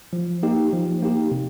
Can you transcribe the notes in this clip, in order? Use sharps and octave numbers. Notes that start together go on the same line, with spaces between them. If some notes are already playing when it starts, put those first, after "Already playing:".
F3
A#3 D#4 G4
F3
A#3 D#4 G4
C3